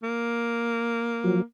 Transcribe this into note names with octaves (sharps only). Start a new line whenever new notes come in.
A#3
F3 F#3